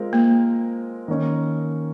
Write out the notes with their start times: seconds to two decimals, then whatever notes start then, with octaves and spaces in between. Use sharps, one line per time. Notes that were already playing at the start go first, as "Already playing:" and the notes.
Already playing: G#3 C4 F4 A#4
0.13 A#3
1.08 D#3 A#3 C#4